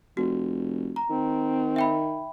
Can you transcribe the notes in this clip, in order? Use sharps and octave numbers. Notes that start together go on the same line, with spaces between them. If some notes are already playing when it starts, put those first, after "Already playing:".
F1 F#4
A#5
D#3 C4
E5 G5 B5